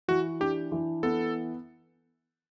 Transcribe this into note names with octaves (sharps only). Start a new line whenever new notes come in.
E3 F#4
D4 G4
E3
B3 A4